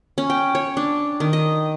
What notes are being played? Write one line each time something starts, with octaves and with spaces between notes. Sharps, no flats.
C#4
G5
C#5
D4
D#3
D#5